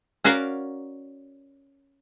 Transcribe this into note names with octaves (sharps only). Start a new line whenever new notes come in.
C#4 F#4 A#4 D5 F5